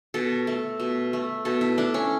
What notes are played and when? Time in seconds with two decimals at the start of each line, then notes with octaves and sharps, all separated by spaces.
0.14 B2 A4
0.47 A3
0.80 B2
1.13 A3
1.45 B2 A4
1.61 E4
1.78 A3 D4
1.94 C#4